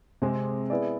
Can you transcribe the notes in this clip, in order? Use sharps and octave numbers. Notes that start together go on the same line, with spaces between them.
C3 G#3 C4 G#4
B3 E4 G#4 D5